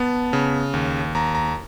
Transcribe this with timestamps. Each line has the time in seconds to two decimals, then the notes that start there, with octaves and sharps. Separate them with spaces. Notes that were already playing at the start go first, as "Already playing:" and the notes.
Already playing: B3 A5
0.33 C#3
0.74 D#2
1.15 D#2 A#5
1.35 A#5